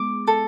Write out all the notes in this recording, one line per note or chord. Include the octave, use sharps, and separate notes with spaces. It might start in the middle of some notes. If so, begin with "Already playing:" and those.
Already playing: G#3 B3 D6
A4